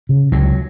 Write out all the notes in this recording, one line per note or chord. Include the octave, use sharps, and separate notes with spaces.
C#3
C#2 F#3